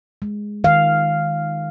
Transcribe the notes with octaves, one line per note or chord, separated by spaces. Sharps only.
G#3
D#3 F5